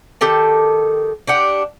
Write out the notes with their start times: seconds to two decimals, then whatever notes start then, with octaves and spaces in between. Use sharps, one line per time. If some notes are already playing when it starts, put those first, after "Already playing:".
0.21 D#3 G4 A4 A5
1.27 D4 G4 F#5